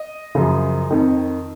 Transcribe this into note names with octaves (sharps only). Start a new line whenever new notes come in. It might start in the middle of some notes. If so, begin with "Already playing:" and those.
Already playing: D#5
F#2 C#3 F3
F2 D#3